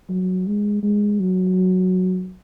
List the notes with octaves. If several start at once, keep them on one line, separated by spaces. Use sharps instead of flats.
F#3
G#3
G#3
F#3